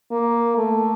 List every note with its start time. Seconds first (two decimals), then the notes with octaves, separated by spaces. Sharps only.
0.11 A#3
0.58 A3